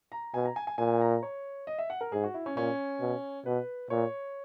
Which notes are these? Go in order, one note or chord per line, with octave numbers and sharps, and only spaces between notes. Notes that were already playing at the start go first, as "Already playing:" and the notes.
A#5
B2 G#5
A#5
G#5
G#5
A#2 G#5
A#5
C#5
D#5
E5
F#5
A#4
G#2 G#4
F#4
E4
C#4
A#2 C#4
B2
B2 B4
A#2 C#5